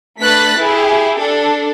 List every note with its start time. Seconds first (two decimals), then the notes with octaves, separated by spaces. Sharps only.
0.20 A3 D4 B4 F#6 A6 B6
0.59 E4 G4 G#4
1.19 D4 A4